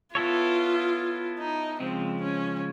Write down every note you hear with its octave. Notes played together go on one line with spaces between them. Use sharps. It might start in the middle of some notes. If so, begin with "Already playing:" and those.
B3 E4 F4 A4 C#5
D#4
C#3 F3 G#3 C4
C#4